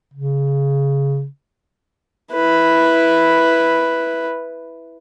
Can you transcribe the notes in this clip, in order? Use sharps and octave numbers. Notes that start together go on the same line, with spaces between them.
C#3
E4 B4